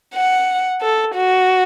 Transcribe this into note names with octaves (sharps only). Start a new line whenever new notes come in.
F#5
A4
F#4